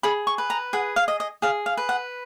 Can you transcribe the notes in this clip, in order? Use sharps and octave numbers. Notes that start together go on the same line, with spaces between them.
G#4 B5
C#6
B4
A#5
G#4 F#5
F5
D#5
D#5
G#4 F5
F5
B4
F#5